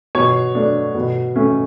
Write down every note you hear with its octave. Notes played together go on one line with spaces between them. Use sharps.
B2 C#5
A3 D4
B2
A3 C#4